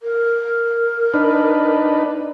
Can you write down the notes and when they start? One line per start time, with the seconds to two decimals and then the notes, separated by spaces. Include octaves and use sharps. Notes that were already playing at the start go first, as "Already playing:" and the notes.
0.02 A#4
1.14 D4 D#4 B4